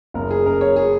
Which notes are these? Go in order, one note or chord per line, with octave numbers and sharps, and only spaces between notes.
F#1 A#4
G#4
F#2 A#4
C#5
G#4